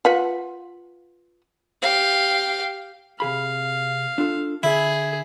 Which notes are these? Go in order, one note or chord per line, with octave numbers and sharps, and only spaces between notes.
F4 B4 F#5
G4 F5
C3 G#4 F5 B5
D4 F4 A4
D3 E4 G#4